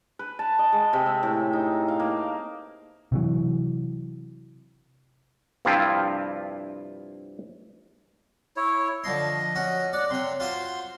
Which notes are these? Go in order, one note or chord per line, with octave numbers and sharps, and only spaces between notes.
B4
A5
D#5
G#3
C3
E5
A2
D#4
F5
A#3
C3 E3 F#3
G2 C3 F3 C4 E4 F4
E4 C#5
D3 F3 D#5 C6
C#4 F#4
D5 F#5
C3 C#5 C6
F4 F#4 C5 C6